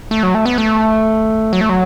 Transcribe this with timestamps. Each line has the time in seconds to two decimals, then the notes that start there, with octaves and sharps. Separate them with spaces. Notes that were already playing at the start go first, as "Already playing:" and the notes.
0.11 A3
0.23 F#3
0.35 A3
0.46 B3
0.58 A3
1.53 F#3
1.61 A3
1.69 F#3